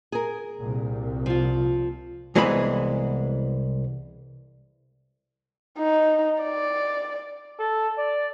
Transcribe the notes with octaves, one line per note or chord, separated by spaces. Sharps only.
G#4 A#4
C2 A#2
F3 F4
C2 E3 G#3 B3 B4 B5
D#4
D5
A4
D5